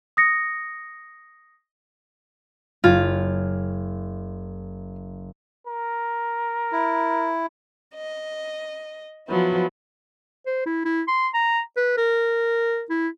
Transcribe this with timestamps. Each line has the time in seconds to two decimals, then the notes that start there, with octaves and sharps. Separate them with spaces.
0.17 D#6 A#6 C#7
2.84 F#1 F4 G#6
5.67 A#4
6.72 E4
7.95 D#5
9.29 F3 F#3 B3 E4
10.46 C5
10.66 E4
10.85 E4
11.08 C6
11.34 A#5
11.76 B4
11.97 A#4
12.90 E4